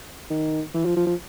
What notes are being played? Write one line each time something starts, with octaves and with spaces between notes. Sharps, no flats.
D#3
E3
F3
F3
F3